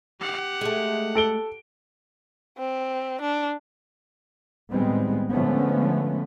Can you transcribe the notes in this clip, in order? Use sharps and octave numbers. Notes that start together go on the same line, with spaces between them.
G4 F#5
G#3 A3
A4 D7 G7
C4
D4
A2 D#3 G3 G#3 B3 C4
D3 F3 G#3 A3 B3 C#4